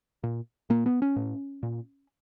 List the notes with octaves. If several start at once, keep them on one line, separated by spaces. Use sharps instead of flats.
A#2
A#2 A#3
B3
C#4
A2
A#2